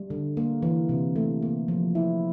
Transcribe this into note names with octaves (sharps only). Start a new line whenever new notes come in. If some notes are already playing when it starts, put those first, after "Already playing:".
Already playing: G3
D3
A#3
E3
C3
A3
A#3
F3
E4